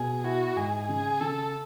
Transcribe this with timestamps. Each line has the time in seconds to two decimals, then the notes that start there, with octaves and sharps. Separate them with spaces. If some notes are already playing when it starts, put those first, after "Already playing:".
Already playing: B2 G#4
0.24 E4 F#4
0.56 G#2 G#4
0.88 C#3 G#4
1.21 C#3 A4